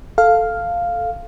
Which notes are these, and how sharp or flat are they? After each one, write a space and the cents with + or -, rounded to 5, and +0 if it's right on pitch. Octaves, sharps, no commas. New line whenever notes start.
A4 +0 F5 +0